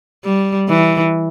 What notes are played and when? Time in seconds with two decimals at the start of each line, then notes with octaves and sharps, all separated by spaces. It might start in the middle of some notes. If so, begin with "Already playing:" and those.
0.24 G3
0.69 E3